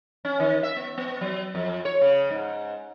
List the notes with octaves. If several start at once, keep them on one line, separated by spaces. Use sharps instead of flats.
C#4
D#3
E5
B3
B3
F#3
F2
C#5
C#3
G#2